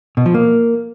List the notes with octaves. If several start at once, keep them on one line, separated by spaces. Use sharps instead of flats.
B2
F3
A#3